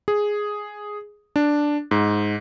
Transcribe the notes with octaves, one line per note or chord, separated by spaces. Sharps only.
G#4
D4
G#2